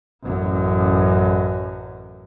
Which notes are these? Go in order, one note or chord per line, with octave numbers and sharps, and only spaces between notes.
A1 F#2